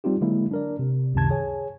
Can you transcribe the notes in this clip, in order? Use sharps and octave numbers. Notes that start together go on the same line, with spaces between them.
G3 C4 D#4 F4 G4
D3 F#3 G#3 A#3 E4
D4 A#4 D5
C3
C#2 F#2 C3 D#3 A5 G#6
G#4 C#5 G#5